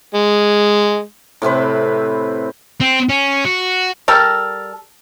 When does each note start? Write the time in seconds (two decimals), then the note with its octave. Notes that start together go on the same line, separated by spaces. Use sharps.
0.15 G#3
1.42 A2 C3 C4 B4
2.80 C4
3.09 C#4
3.45 F#4
4.08 G3 A4 A#4